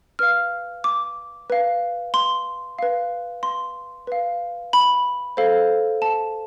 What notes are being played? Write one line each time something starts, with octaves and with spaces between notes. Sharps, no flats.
B4 F5 F6
D6
B4 F5
C6
B4 F5
C6
B4 F5
B5
A4 C5 F5
A5